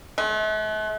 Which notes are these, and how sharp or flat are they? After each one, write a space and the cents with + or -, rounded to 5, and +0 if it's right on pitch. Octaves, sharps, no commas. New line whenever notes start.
A3 -45